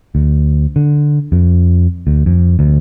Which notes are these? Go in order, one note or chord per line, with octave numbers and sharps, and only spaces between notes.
D2
D3
F2
D2
F2
D2